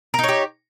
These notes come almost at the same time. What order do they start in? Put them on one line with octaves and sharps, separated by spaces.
A#4 D#4 C#5 G4